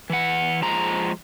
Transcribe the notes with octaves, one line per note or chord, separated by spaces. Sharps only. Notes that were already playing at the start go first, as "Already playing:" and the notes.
E3 F#5
F3 G#3 A#5